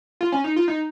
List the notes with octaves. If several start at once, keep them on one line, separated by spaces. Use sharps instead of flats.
F4
C#4
D#4
F4
D#4